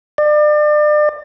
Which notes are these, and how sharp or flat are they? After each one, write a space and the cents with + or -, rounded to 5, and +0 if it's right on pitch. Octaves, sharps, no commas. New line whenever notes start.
D5 +35